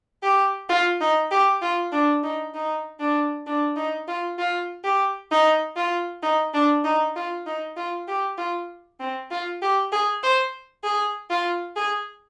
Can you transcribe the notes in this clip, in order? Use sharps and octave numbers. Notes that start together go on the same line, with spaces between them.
G4
F4
D#4
G4
F4
D4
D#4
D#4
D4
D4
D#4
F4
F4
G4
D#4
F4
D#4
D4
D#4
F4
D#4
F4
G4
F4
C4
F4
G4
G#4
C5
G#4
F4
G#4